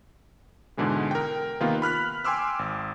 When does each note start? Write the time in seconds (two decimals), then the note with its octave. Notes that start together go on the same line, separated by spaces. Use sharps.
0.77 G#2 B2 D3 E3 G#3
1.11 A#4 G5
1.60 C3 D#3 A#3 B3 F4
1.82 B5 F6 F#6 B6
2.24 G5 G#5 C6 D6 E6 F6
2.59 G#1